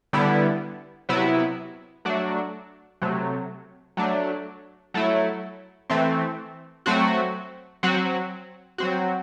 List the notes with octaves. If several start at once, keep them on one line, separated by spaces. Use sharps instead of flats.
D3 G3 B3 E4
C3 F#3 B3 E4
F#3 A3 D4 F#4
C3 F#3 A3
F#3 A3 D4
F#3 A3 E4
E3 A3 C4
F#3 A3 C4 F#4
F#3 C4 F#4
F#3 C4 F#4